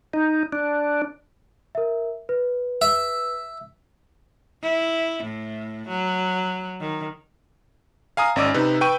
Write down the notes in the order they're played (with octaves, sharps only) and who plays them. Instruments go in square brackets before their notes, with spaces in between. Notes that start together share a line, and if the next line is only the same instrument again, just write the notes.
[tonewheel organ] D#4
D4
[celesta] A#4 E5
B4
[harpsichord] E5
[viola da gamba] E4
A2
F#3
D#3
[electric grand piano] F5 G#5 A#5 D#6
G#1 C#4 D5 D#5 D6 E6
C3 D#4 B4
B4 G5 C#6 D#7